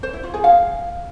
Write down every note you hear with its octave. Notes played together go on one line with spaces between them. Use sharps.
C5
E4
F4
G#4
F5